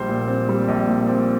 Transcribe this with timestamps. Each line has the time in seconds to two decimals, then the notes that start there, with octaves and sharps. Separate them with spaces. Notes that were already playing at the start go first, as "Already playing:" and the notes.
Already playing: A#1 G3 C5
0.09 A#2
0.28 C4
0.49 G3
0.68 A#1
0.88 A#2
1.08 C4